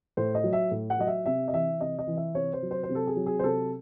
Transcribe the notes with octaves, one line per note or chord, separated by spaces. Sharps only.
A2 C5
D#5
F#3
E5
A2
F#5
F#3 D#5
E5
C3 E5
D#5
E3 E5
C3 D#5
D#5
E3
E5
C3 C#5
C5
F#3
C5
C5
C3
A4
G#4
F#3
G#4
C5
C3 A4